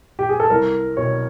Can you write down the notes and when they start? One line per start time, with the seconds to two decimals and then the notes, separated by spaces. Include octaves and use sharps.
0.19 G4
0.29 G#4
0.40 A4
0.50 C2 A#4
0.97 B2 G3 C#5